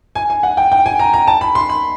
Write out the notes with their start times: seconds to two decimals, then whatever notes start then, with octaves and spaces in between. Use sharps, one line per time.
0.15 G#5
0.30 G#5
0.43 F#5
0.57 G5
0.72 G5
0.86 G#5
0.99 A#5
1.13 A#5
1.27 A5
1.41 B5
1.55 C6
1.69 B5